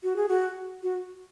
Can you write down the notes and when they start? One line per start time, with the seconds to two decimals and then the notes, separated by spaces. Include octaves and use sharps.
0.04 F#4
0.16 G#4
0.28 F#4
0.83 F#4